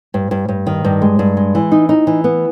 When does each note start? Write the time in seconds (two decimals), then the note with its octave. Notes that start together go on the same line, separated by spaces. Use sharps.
0.14 G2
0.31 G2
0.48 G2
0.67 D#3
0.84 G2
1.02 G#3
1.19 G2
1.37 G#3
1.55 E3
1.72 D#4
1.89 D#4
2.07 E3
2.24 B3